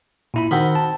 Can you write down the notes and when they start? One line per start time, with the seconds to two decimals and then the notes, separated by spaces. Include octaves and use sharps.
0.34 A#2 E4 B5
0.51 D#3 C4 F#4 B5
0.75 A5